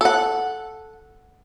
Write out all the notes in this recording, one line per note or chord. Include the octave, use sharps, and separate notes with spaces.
A4 F#5